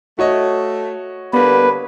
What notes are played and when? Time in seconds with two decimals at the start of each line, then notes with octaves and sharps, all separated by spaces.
0.19 A3 F#4 C#5 D#5
1.33 D3 G3 A#3 B3 B4